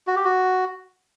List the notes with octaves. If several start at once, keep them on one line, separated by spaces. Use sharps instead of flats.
F#4
G4
F#4